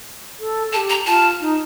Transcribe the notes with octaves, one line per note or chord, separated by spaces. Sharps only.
A4
A4 A5
G4
A#5
F4 A5
D#4